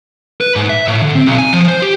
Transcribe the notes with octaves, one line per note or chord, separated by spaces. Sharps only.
B4
G#2
E5
A2
D3
C4
B1
G#5
F3
C5
G4